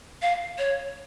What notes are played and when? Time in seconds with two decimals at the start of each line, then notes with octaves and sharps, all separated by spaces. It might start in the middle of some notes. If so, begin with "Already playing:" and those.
0.22 F5
0.58 C#5